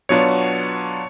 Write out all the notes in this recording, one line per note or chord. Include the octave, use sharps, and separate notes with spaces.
B2 F#3 B3 D4 F4 C#5